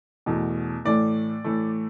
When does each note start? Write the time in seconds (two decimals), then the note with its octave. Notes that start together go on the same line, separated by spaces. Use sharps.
0.26 E2 B2 A3
0.85 A2 E3 A3 D5
1.44 A2 E3 A3